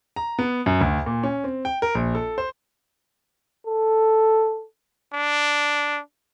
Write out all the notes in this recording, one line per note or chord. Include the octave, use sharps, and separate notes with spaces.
A#5
B3
F#2
D2
A#2
C#4
C4
G5
A#4
A#1
A4
C5
A4
D4